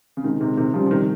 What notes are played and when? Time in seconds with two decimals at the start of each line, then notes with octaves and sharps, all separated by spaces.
0.17 C#3
0.24 C3 D#3 G#3
0.40 C3 D#3
0.57 C3 D#3
0.74 C#3 F3 G3
0.86 F3
0.91 C3 D#3